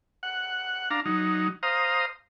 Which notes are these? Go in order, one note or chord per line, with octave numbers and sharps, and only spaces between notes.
F#5
D4 F5 A#5
F#3 D#4
C5 F5 A#5 D#6